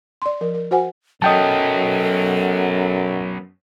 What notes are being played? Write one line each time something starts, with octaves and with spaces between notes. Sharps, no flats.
D5 C6
F3 A#4
A#4
F#4 C5 F#5 G#5
F#2 F#3 B3 A4 D#5 G5 A5